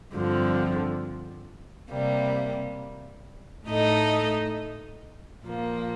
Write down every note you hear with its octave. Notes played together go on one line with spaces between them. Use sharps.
G2 D3 F3 C4
C3 G3 A#3
A2 A3 D#4 A4 D#5
A#2 F3 A#3